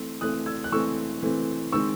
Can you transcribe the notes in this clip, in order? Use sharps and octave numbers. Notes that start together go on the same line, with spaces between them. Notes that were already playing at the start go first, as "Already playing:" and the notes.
Already playing: E3 A3 C4
E3 A3 C4 D#6 F#6
E6 G#6
F#6
E3 A3 C4 C#6 E6
E3 A3 C4
D#3 G#3 C4 C#6 E6